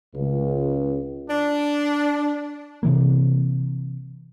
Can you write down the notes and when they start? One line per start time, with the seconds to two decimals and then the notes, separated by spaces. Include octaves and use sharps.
0.15 C#2
1.29 D4
2.83 C3 E3 A#3